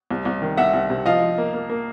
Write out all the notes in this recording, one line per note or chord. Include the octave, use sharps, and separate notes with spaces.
C2
C2
D#3
C2 E5 F#5
C2
C3
F3 D#5 F5
F3
A#3
A#3
A#3